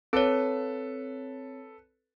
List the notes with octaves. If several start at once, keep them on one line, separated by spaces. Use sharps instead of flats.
C4 A4 B4 C#5